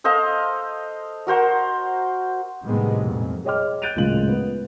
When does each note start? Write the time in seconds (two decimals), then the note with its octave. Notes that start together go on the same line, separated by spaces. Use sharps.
0.04 A4 C5 D#5 F5
1.27 F#4 A#4 C5 F#5
2.65 A2 C3 D#3 G3 G#3 B3
3.02 F2 A#2
3.45 G#4 C#5 D#5 G5 D6 F6
3.82 F#6 G6 A6 D7 D#7 F7
3.96 D1 A#2 C#3 G#3 F#7
4.29 B3